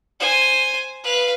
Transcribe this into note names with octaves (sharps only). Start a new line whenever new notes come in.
C5 G#5
B4 F5